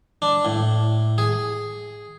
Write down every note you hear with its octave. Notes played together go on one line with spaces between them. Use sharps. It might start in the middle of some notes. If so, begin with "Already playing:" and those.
D4
A2
G#4